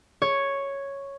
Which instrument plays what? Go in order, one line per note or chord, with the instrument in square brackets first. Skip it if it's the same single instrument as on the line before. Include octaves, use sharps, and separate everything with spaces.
[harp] C#5